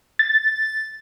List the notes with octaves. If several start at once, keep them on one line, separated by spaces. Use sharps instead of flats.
A6